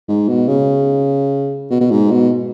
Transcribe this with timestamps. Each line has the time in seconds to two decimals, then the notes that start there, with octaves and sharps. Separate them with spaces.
0.08 G#2
0.29 B2
0.48 C#3
1.71 B2
1.81 B2
1.91 G#2
2.12 B2